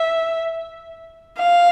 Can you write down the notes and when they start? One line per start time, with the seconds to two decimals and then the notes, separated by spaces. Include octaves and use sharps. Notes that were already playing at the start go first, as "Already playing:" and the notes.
Already playing: E5
1.38 F5